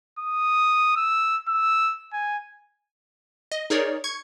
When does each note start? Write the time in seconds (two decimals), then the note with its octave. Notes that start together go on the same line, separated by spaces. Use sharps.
0.19 D#6
0.96 E6
1.48 E6
2.13 G#5
3.52 D#5
3.70 D#4 G#4 A#4 C#5 D5
4.04 C#6 G#6 C#7